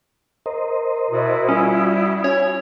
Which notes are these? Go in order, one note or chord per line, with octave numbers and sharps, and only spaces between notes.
A#4 C5 D#5
B2 E4 F#4 D#6
G3 C#4 F4
C#5 G#5